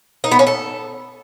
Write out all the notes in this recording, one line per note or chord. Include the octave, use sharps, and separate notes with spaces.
D#4
B3
C#4
A4